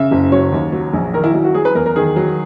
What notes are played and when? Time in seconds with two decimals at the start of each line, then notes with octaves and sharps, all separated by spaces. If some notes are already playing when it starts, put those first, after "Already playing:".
Already playing: C#3 E5
0.11 F#1
0.32 F#3 C#5
0.52 D#2
0.72 F#3
0.93 A#1
1.14 D#3 A#4
1.24 E4
1.34 F#3 E4
1.44 F#4
1.54 F#3 G#4
1.65 B4
1.75 E2 A#4
1.86 A#4
1.96 D#3 G#4
2.16 F#3